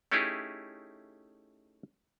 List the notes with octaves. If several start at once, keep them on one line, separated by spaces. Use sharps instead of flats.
A3 C#4 D#4 E4 G4 G#4